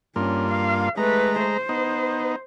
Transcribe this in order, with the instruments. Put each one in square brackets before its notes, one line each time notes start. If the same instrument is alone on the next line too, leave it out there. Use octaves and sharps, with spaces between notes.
[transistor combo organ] G2 A#3 F4 [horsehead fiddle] C#4
[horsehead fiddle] F5
[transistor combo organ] G#3 A#5 [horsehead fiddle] A3 B4
[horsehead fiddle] C5
[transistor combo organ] B3 D#4